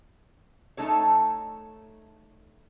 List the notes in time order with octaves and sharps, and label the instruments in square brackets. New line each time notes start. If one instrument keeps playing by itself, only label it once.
[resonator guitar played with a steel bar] A3 D#4 A4 C#5